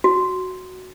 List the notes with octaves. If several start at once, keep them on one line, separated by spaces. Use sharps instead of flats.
F#4